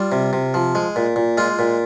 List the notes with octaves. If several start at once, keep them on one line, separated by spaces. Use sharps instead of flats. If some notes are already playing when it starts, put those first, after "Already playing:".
Already playing: G3 F4
C3
C3
F3
G#3
A#2
A#2
G#3 F4
A#2